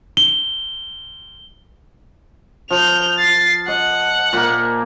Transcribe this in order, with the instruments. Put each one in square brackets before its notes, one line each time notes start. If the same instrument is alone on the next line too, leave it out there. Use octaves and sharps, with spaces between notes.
[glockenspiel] G7
[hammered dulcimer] F3 [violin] G6 F7
[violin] A6 C7
[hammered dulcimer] D#5 [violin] F#5
[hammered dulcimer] A#2 A#3